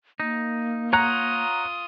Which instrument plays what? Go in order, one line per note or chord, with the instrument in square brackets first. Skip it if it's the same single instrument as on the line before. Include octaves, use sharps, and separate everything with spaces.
[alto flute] A#3 [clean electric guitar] D#4
[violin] F4 D#6 [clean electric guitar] C#5 F#5 [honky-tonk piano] A#5